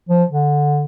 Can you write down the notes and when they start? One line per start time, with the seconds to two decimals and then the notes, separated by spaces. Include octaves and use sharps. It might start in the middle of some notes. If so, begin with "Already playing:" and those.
0.09 F3
0.30 D3